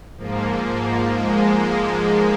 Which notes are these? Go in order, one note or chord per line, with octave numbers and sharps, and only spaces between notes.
G#2 F3 A#3
G#3